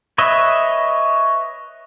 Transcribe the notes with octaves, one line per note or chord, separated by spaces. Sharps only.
B4 C#5 D#5 E5